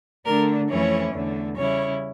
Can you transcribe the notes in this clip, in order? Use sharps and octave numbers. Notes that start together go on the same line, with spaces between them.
D3 A3 D4 A#4
F2 E3 A3 C#4 E4 C#5
E2 D3 A3
C#3 G3 C#4 E4 C#5